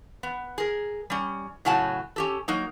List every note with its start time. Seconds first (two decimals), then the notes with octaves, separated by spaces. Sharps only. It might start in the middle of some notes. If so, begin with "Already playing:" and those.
0.23 B3
0.58 G#4 A#4
1.10 G3 C#4
1.65 A2 C#3 F#3 F#5 G#5 A5
2.16 C#4 G4 A4
2.48 F#3 A#3 D#4